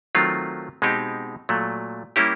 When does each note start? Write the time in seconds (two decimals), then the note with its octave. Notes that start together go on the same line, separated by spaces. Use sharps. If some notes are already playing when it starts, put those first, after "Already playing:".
0.15 D#3 F#3 A3 C4 F4
0.82 B2 G#3 C4 D#4 G4
1.49 A#2 F#3 A3
2.16 G3 A#3 C#4 E4 G4